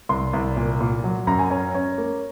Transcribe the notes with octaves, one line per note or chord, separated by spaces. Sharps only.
C2 C6
C2
A#2
A#2
F#3
F#2 A#5
G#5
C#4 A#5
C#4
A#3